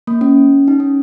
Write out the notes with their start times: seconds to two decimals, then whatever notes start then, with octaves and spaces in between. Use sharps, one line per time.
0.07 A#3
0.21 C#4
0.68 D#4
0.80 C#4